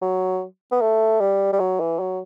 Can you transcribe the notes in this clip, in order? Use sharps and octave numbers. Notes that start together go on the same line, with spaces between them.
F#3
B3
A3
G3
G3
F#3
E3
F#3